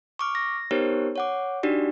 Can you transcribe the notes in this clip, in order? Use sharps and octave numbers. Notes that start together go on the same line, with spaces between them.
C#6 D6 F6
A#6
B3 D#4 G4 A#4 C5 C#5
C#5 F#5 D6
D4 D#4 F#4 G4 D5